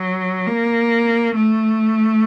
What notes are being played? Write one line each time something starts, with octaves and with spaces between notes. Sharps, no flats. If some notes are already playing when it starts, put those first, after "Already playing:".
Already playing: F#3
A#3
A3